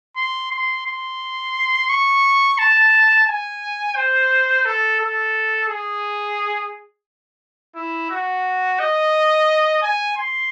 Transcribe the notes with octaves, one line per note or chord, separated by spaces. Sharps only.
C6
C6
C6
C#6
A5
G#5
C5
A4
A4
G#4
E4
F#4
D#5
G#5
C6